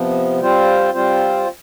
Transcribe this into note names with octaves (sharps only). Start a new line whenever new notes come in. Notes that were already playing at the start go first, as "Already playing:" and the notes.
Already playing: C3 F3 B3
G3 C4 F4 C5
G3 C4 F4 C5